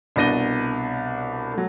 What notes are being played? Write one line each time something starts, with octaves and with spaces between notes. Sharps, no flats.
C2 B2 D4 A#6 D#7 G7
F#3 A3